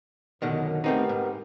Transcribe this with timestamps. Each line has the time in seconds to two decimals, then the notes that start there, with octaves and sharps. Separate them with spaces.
0.42 F#2 B2 D3 D#3
0.84 A3 B3 C4 D#4 G4 A#4
1.09 G#2